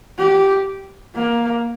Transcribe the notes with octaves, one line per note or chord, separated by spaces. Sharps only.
G4
A#3